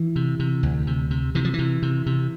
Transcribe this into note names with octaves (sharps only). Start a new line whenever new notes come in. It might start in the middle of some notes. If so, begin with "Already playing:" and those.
Already playing: E3
C3
C3
D2
C3
C3
C3 E3
F3
C3 E3
C3
C3